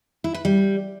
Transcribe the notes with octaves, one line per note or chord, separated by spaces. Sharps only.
E4
B4
G3